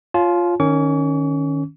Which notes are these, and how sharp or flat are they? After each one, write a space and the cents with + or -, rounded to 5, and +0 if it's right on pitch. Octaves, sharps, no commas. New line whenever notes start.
F4 +0 C#5 +0 A5 -45
D#3 -15 C#4 +0 C#6 +45